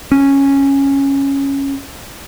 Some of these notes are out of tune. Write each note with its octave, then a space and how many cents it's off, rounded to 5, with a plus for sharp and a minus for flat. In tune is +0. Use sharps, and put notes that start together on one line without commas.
C#4 -5